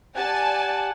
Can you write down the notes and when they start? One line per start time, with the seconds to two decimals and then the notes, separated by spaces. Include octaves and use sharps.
0.16 G4 D5 F#5 G#5 A5